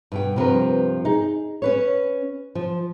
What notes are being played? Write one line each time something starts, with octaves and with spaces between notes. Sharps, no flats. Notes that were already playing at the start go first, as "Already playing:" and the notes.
G2 B2 G5
G2 C3 F3 B3 A#4 B4
D#4 G#4
C#4 B4 C#5
F3